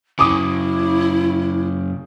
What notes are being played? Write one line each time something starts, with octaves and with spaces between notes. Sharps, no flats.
F#2 C#3 E4 D6 D#6